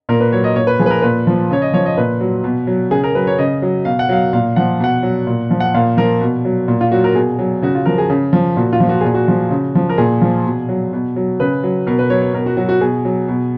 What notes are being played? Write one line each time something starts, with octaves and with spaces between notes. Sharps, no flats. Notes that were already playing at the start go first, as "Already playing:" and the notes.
A#2 A#4
B4
F#3 C#5
D#5
A#2 C#5
B4
F3 G#4
B4
A#4
A#2 B4
F3
C#3 C#5
D#5
F3 C#5
D#5
A#2 B4
F#3
B2
F#3
C#3 G#4
A#4
F#3 B4
C#5
C#3 D#5
F#3
B2 F5
F#5
F#3 F5
A#2 F5
F3 F#5
B2 F#5
F#3
A#2
F3
F#5
A#2 F5
F3 A#4
B2
F#3
A#2
F4
F#3 F#4
A#4
B2 G#4
F#3
C#3 F#4
F4
F3 A#4
G#4
C#3
F3
A#2 F#4
F4
F3
F#4
A#2 G#4
F#4
F3
C#3
F3
A#4
A#2 G#4
F3
B2
F#3
B2
F#3
C#3 B4
F#3
B2 A#4
B4
F#3 C#5
C#5
B2 A#4
F#4
F#3 F#4
F#4
B2 G#4
F#3
B2